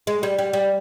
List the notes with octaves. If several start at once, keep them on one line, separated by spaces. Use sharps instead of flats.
G#3
G3
G3
G3